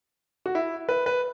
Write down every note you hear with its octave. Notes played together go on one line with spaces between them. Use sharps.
F#4
E4
B4
B4